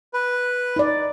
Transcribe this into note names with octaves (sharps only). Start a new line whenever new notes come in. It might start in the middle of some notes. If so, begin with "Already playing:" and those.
B4
D#4 D5